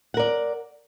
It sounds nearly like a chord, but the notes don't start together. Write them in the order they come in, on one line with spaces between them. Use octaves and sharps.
F#5 A#4 D5